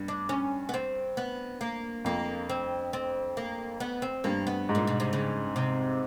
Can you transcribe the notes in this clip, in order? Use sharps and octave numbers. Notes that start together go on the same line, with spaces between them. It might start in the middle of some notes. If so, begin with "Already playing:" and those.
Already playing: G2
D4
C#4
B3
C4
B3
A#3
F2 A#3
C4
C4
A#3
B3
C4
G2 A#3
B3
G#2
A#2
B2
C3
C#3
C3